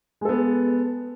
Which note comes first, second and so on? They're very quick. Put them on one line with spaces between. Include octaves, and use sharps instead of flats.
G#3 A4 B3